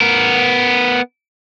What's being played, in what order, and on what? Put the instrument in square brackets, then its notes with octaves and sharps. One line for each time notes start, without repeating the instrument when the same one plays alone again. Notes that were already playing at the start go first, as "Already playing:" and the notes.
[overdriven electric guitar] B3 A#4